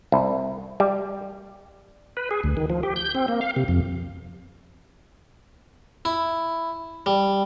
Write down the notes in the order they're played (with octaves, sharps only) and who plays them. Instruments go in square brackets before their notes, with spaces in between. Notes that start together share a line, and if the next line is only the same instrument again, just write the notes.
[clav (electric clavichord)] C2
G3
[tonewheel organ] B4
G#4
D2
D#3
F3
G4
G6
C4
A#3
F5
C3
F2
[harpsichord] E4
G3